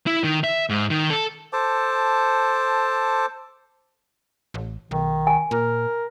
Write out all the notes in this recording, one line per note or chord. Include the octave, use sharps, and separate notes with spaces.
E4
D#3
E5
G#2
D#3
A4
A4 C5 A5 D6
A1
B1 D#3
G#5
A#2 A#4